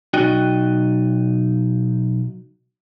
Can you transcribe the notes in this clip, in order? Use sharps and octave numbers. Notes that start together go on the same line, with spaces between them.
B1 D#4 F#4 D5 D#5 G5